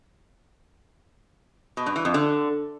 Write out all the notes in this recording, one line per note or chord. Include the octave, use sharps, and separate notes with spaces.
B2
G2
E3
F2
D3